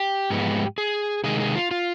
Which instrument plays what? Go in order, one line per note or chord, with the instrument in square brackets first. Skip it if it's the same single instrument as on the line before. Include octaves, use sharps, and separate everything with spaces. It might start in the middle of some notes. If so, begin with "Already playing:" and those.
Already playing: [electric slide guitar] G4
G#2 F3 G#3 B3
G#4
C3 D#3 G#3 G#4
G#4
F4
F4